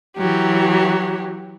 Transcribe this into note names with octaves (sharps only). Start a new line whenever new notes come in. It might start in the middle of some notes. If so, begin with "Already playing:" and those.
E3 F#3 G4